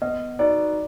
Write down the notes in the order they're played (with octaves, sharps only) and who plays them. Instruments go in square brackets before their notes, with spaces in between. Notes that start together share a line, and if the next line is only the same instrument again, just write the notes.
[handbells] B3 [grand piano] D#5
[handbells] D#4 F#4 B4 [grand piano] D5